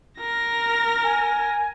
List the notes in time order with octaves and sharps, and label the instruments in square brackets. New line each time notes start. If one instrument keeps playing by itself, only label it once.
[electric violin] A#4 A#6
[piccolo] G#5